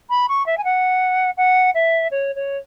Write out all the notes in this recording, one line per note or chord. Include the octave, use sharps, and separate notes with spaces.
B5
C#6
E5
G#5
F#5
F#5
E5
C#5
C#5